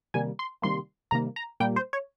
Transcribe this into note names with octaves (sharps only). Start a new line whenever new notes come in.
C3 D#3 G3 A#3 G#5
C6
C3 D#3 G3 A#3 C6
C3 D#3 G3 A#3 A#5
A#5
A#2 G3 A#3 G5
C5
C#5